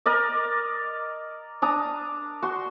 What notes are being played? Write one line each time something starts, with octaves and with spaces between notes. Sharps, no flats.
A#4 D5 D#5
D4 A#5 D#6
F#4 C6